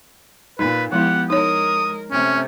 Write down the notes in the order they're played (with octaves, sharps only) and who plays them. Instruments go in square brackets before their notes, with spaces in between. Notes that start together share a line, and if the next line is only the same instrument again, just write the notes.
[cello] A#2 [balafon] D#4 [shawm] B4
[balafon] F3 G#3 E4 [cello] B3 G4 [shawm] F#5
[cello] G#3 A#4 [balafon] D#4 C#5 [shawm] D#6
[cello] C3 A3 [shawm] C#4